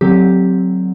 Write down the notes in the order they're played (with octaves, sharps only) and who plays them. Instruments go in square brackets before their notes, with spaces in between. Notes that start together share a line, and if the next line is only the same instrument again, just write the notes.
[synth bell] D3 F#3 C4 G4